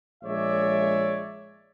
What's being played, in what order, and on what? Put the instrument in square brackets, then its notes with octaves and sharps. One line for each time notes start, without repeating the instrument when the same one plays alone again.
[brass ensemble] A#1 G#3 C#5 D5 E5